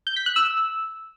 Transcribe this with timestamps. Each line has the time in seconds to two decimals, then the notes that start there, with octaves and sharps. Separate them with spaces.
0.07 G6
0.16 B6
0.26 F#6
0.36 E6